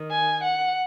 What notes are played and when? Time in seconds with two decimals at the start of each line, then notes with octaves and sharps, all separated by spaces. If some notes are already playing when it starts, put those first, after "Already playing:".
Already playing: D#3
0.12 G#5
0.44 F#5